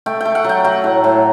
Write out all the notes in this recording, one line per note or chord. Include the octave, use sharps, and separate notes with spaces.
A3 G5
A3 G5
F#5
F#3 G5
F#3 F#5
A2
A2